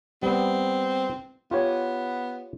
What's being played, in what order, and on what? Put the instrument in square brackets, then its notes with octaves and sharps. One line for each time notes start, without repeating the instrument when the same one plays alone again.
[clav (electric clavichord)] G3 B3 [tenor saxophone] C4
[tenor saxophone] B3 [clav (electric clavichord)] F4 G4 C#5